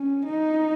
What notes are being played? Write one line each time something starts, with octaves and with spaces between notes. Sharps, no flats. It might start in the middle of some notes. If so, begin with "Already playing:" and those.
Already playing: C#4
D#4